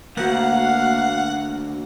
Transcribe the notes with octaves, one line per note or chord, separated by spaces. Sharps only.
D2 A#3 F#4 F5 F#5